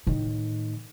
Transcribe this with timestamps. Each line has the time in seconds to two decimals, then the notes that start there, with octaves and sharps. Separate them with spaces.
0.07 A2 D#3